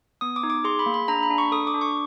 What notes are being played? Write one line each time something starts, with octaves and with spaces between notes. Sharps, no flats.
B3 D#6
D6
D#4
D6
G#4 C6
B5
A#3
B5
D4 A#5
B5
D4
C#6
A4 D#6
D6
D4
C#6